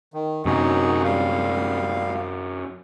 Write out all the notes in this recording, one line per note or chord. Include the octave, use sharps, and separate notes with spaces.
D#3
F#2 C3 F#3 D#4 F#4 G#4
G3 F5